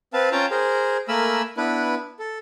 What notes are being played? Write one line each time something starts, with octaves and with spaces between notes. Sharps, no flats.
C4 B4 F5 A5
C#4 F4 F5 G5 A5 A#5
G#4 A#4 C5
A3 A#3 A#4 G#5 B5 E6
B3 D4 E4 B4
A4